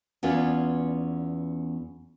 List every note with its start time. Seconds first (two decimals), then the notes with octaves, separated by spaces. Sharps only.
0.23 E2 B3 C#4 F4 D5